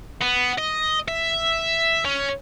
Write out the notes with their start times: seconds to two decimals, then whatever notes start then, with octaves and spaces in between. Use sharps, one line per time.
0.22 B3
0.58 D#5
1.08 E5
2.05 C#4